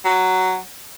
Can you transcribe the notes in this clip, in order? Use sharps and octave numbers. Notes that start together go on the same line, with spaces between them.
F#3